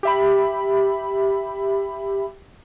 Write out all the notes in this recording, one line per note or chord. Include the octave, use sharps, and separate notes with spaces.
G4 E5 B5